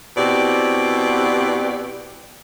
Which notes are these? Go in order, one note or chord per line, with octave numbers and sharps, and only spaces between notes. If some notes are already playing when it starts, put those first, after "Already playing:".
B2 C4 E4 G4 D5